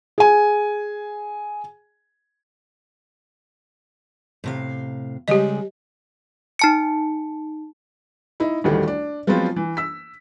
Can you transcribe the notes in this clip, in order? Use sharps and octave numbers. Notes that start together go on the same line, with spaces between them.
G#4 G#5
A2 C3 F5
C#3 G3 G#3 G4 D#5
D#4 A5 C#7
D#4 E4
A1 D2 D#3 G3 A3
D4
F3 F#3 G#3 B3 C4 F4
E3
E6 B6